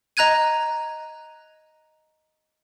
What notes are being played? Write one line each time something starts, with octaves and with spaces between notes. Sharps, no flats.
D#5 A#5 F#6 G#6 D#7